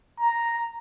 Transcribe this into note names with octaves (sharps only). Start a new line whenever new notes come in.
A#5